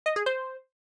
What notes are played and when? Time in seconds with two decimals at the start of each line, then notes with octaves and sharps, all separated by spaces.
0.06 D#5
0.16 G#4
0.26 C5